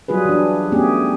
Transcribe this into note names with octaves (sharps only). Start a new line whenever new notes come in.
F#3 G3 F4 G#4 B4
E3 D4
A3 B3 C#4 G4 G#4